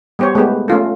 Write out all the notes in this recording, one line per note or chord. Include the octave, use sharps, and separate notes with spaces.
G3 B3 G4 C5 C#5
G#3 A3 B3 G4
A3 C#4 F4 A4